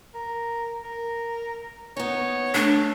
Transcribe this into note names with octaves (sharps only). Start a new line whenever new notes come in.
A#4
A#4
B3 D#4 C#5
A3 D4